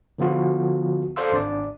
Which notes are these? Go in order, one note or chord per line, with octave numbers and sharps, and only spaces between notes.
D3 F3 B3 F4 F#4
A4 C5 D5 F5 C6 E6
G#1 D4 D5